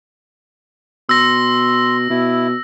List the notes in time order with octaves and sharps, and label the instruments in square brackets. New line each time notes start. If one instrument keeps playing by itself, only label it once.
[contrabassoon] B2 [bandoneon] C6 [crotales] E6 A#6
[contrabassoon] B2 [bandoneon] E4